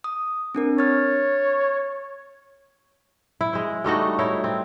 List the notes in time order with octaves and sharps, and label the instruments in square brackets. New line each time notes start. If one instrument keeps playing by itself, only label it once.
[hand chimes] D#6
C4 D4 A#4
[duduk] C#5 [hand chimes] F6 A6
[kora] E4
G#3 C5
G3 A3 D#4 F#4
D#4 E4 C#5
C4